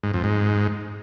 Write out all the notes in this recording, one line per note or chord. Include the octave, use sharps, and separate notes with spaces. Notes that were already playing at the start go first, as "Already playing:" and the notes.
G#2
F2
G#2